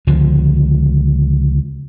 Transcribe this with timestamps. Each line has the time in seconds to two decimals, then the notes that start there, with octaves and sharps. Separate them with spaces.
0.07 C#2 D3 F3